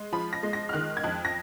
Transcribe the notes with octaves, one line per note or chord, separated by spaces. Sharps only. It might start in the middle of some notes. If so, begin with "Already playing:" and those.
Already playing: G#3
F3 B5
A#6
G#3
A#6
F6
D#3 F#6
G#6
F2 F#6
A#6